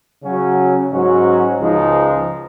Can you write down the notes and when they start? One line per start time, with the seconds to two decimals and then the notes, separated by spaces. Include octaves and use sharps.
0.22 C#3 F#3 C#4 F#4
0.91 G#2 F#3 C#4 F#4
1.59 C#2 C#3 F3 G#3 D#4